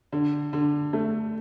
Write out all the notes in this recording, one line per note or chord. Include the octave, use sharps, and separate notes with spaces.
D3
D3
A3